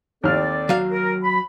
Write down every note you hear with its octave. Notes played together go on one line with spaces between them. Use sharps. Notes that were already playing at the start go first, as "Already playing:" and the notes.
D#2 C4 A4 D5 F6
F#3 F5
A#4
B5